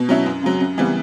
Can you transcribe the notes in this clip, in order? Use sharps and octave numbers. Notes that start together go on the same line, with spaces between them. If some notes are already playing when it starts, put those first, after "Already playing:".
Already playing: B2
F#3 C#4 E4
F#2
C#3 F#3
F#2
C#3 E3 G3 B3